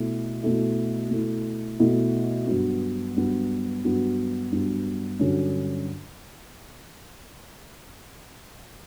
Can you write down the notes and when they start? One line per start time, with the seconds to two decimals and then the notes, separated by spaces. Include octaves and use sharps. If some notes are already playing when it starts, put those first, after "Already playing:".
Already playing: B2 A3 E4
0.43 B2 A3 E4
1.11 B2 A3 E4
1.79 B2 A3 E4
2.47 G2 F#3 B3
3.16 G2 F#3 B3
3.84 G2 F#3 B3
4.52 G2 F#3 B3
5.19 G2 D3 F#3 C#4